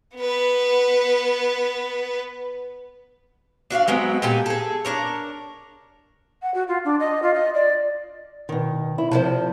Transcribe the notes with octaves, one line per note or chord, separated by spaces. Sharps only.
B3 B4
D4 F#4 E5 F5
F#3 G#3 B3 C4
A#2 G4 A4 G#5
G#4 A4
D4 A#4 C#5
F#5
F#4
F4
D4
D#5
F4
D#5
D5
B2 D#3
E4
C3 F3 E4 C5 A5